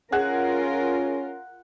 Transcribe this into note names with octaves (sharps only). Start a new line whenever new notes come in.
C#4 F4 G#4 A#4 F#5